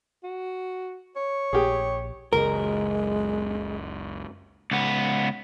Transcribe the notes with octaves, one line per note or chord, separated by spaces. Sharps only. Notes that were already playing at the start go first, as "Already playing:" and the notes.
F#4
C#5
A#1 G4 G#4
F#1 C#2 G#3 A#4
C#2 B3